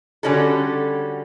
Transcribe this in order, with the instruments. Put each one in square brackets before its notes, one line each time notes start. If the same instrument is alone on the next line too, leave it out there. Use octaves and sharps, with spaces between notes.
[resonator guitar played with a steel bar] D3 G3 C#4 F#4 A4